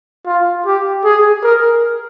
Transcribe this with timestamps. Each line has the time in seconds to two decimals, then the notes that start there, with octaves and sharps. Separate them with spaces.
0.26 F4
0.66 G4
1.04 G#4
1.43 A#4